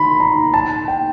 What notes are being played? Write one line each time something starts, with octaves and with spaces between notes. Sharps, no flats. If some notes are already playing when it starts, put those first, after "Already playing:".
Already playing: B5 C6
A#5
A5
G5